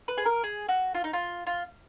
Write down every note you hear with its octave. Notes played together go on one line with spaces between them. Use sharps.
B4
G#4
A#4
G#4
F#4
F4
D#4
F4
F4